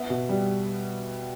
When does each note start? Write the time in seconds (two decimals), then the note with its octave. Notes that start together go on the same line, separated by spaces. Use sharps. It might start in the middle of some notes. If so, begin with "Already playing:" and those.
Already playing: B3 E5
0.10 B2
0.29 G3